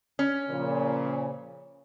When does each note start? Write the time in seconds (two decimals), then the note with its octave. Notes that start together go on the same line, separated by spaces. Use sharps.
0.19 C#4
0.50 A#2 C#3 F3